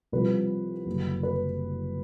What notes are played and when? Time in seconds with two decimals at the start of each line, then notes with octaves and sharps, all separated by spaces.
0.12 C2 C3 F3 B4
0.86 F#1 F#2 D3
1.23 B4